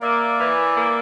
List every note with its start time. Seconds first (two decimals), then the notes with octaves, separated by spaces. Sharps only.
0.02 A#3 D5 E5
0.39 E3
0.75 A#3